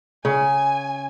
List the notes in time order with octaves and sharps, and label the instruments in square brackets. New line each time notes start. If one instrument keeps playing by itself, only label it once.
[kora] C#3 [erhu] G#5